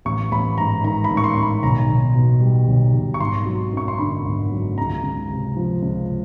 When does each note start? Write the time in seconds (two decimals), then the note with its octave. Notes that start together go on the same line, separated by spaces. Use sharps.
0.05 A1 C#6
0.31 A1 B5
0.58 G#2 A#5
0.84 D#3 A#5
1.04 B5
1.10 A1
1.17 C#6
1.24 C6
1.36 A1
1.43 B5
1.63 B1 A#5
1.89 B1
2.15 B2
2.41 G3
2.68 B1
2.94 B1
3.14 C#6
3.20 G#1 C6
3.46 F#3
3.73 F#2 C#6
3.88 C6
3.98 D3 B5
4.25 G#1
4.52 F#3
4.78 C#2 A#5
5.03 C#2
5.30 C3
5.56 F3
5.82 C#2